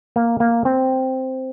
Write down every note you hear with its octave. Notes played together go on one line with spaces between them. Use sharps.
A#3
A#3
C4